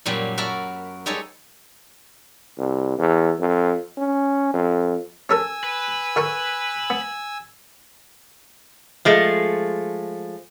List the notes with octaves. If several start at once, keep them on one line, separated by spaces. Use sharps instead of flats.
F#2 A#2 F#3 G3
F#4 A#4 E5 A5 B5
G3 G#3 D#4 A4 C#5
C2
E2
F2
C#4
F2
C#4 A4 A#4 G#5 E6
B4
D3 A#4 C#6
B3
F3 G#3 A3